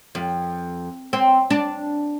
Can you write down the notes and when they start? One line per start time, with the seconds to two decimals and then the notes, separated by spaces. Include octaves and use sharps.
0.15 F2
1.13 C4
1.50 D4